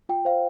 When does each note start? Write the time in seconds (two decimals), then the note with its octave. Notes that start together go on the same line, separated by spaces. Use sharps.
0.09 F4 G5
0.25 C5 F5